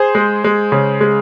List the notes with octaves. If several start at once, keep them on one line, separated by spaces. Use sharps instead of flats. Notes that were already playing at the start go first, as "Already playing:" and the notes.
Already playing: G#4 C5
G#3
G#3
C#3
G#3